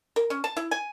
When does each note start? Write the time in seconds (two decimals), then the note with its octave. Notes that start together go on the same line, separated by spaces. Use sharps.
0.16 A#4
0.30 C#4
0.44 A5
0.57 E4
0.71 G#5